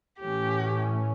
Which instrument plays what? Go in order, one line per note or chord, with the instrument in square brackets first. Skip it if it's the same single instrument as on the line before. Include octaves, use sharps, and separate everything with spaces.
[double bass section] A2 E3 A3 C#4 [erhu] G4